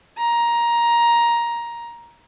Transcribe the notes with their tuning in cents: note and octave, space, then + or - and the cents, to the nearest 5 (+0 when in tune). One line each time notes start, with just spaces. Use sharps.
A#5 +15